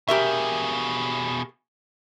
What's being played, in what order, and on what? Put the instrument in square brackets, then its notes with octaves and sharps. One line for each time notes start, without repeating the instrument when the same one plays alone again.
[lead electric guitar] B2 G#4 [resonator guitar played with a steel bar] G4 A#4 E5